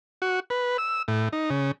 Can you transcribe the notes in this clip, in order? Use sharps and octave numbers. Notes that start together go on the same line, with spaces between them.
F#4
B4
E6
A2
D#4
C#3